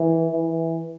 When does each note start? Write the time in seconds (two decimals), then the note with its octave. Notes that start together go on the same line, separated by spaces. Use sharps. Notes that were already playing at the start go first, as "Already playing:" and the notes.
Already playing: E3
0.32 E3